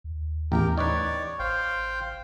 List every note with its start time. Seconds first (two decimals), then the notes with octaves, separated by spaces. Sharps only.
0.04 D#2
0.52 A1 E2 G4 A#4
0.78 D#4 B4 C#5 D5
1.39 A1 C5 F5 G5